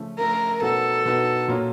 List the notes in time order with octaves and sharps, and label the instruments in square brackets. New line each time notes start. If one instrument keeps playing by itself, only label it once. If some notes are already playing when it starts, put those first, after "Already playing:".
Already playing: [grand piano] C#3 F3 A3
[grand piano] C#3 F3 A3 [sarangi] A#4
[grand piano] B2 F#3 B3 D#4 F#4 [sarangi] A4
[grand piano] B2 F#3 B3 D#4 F#4
A#2 F#3 A#3 C#4 F4